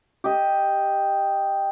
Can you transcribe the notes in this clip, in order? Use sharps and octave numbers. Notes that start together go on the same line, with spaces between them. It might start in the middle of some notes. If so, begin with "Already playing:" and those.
G4 D#5